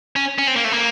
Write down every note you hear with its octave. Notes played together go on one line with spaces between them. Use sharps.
C#4
C#4
C4
A#3
A3
A#3